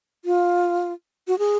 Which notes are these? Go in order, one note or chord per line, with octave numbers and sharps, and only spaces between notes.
F4
F#4
G#4